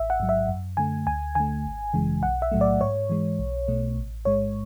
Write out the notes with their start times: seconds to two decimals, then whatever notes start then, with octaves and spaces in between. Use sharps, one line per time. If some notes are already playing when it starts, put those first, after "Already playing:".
Already playing: A1 E5
0.10 F#5
0.20 G#2 F#3
0.29 E5
0.49 F#2
0.77 D3 A3 G#5
1.07 D2 G#5
1.35 D3 A3 G#5
1.65 G#1
1.94 F#2 C#3 E3 G#3
2.22 B1 F#5
2.42 E5
2.52 A2 F#3 A3
2.61 D5
2.80 G#2 C#5
3.10 E3 G#3
3.39 B1
3.68 B2 A3
3.97 A1
4.25 G#2 G#3 C#5